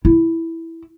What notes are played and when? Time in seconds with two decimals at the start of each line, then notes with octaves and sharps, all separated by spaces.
0.05 E4